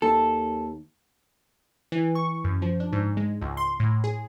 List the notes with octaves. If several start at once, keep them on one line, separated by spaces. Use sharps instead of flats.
D#2 A4
E3
C#6
F#2
F3
D4
G#2
G#3
C#2
C6
A2
G#4